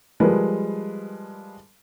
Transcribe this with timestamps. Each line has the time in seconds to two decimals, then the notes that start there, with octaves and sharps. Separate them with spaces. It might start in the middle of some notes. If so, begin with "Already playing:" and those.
0.20 F3 G3 G#3 G#4 A#4 B4